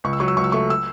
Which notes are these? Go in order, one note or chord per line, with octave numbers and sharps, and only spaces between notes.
C#2 C#6
E6
F#3 C#6
E6
C#2 C#6
E6
A3 C#6
E6